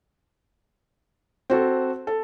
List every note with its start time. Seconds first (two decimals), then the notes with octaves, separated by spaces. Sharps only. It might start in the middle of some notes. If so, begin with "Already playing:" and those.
1.50 C4 F#4 A4
2.07 A4